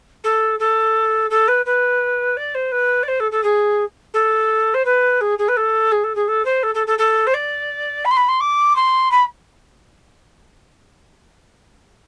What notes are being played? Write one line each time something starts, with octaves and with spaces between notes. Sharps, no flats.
A4
A4
A4
B4
B4
D5
C5
B4
D5
C5
A4
A4
G#4
A4
C5
B4
G#4
G#4
B4
A4
G#4
A4
G#4
A4
C5
A4
A4
A4
A4
C5
D5
B5
C6
B5
C6
D6
C6
B5